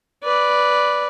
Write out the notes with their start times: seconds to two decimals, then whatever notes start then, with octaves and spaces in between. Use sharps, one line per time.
0.23 B4 D5